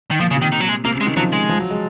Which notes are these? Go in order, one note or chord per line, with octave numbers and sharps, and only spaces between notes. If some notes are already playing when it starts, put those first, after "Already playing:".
D#3
A#2 F3
C#3
C3
D#3
D#3
F#3
G#3
C3 A#3
C#3
G#3
D#3
F3 F#3
G#3
F3
F#3
G#3